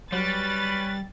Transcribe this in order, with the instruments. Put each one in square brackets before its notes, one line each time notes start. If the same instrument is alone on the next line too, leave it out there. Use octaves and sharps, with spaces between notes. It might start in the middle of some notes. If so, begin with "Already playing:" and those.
[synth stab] F#3 [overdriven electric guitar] G3 [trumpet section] C#4 B4 [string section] A6